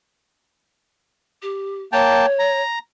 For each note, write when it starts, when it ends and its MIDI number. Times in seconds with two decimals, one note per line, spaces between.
1.42 1.82 67
1.93 2.26 58
1.93 2.60 73
1.93 2.26 79
1.93 2.26 81
2.39 2.79 82